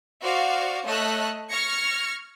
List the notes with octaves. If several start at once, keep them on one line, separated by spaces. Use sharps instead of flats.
F#4 C5 D5 F5
A3 C#5 D#5 E6 F#6
C#6 F6 G#6 A#6 C#7